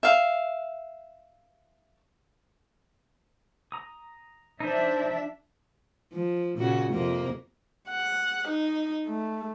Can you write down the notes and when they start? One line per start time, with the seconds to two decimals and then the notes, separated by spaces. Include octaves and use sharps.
0.03 E5 F5
3.72 A#5 D#6
4.60 F3 D4 D#4 C5 E5
6.12 F3
6.58 A#2 C#3 F#4
6.93 F2 C3 A#3
7.90 F#5
8.49 D#4
9.06 A3